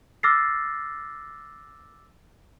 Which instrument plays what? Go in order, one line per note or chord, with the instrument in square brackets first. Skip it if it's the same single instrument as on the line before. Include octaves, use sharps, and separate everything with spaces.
[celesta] D6 E6 F6 A6 A#6 C7